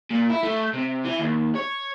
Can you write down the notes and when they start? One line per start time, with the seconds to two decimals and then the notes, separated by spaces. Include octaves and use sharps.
0.11 A#2
0.30 E4
0.43 A3
0.74 C3
1.04 E3
1.19 D#2
1.56 C#5